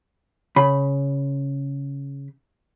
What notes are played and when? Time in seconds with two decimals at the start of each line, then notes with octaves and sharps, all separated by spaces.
0.56 C#3 B5